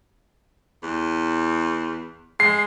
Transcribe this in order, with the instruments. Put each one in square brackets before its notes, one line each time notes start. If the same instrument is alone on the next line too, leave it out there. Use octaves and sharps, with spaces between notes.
[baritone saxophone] E2
[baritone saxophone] G#3 [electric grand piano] C7